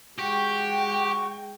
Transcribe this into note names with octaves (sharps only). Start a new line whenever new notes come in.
G#3 F#4 G4 G5 C#6